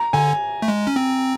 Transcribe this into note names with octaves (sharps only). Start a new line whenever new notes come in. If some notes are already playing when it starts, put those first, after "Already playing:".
Already playing: A#5
D3 G#5
A3
G#3
C#4
C4